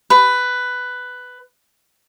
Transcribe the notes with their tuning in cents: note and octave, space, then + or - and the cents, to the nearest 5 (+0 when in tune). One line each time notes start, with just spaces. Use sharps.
B4 +10